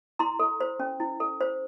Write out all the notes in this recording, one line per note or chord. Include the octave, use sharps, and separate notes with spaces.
E4 A#5 C6
A4
C5
C#4
E4
A4
C5